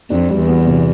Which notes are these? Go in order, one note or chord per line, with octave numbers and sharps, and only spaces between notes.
F2 D4
G3
E2
B3
C3